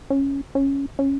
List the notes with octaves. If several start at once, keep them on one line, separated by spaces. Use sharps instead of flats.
C#4
C#4
C#4